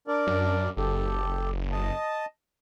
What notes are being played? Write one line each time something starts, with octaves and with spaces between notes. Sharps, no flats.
D4 A#4 D5
F#2
F#1 G4 A4
D#5 A5